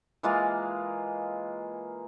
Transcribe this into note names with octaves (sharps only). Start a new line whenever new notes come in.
E3 G#3 A#3 F4